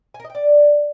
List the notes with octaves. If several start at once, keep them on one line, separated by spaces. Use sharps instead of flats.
G#5
A#4
D#5
G5
D5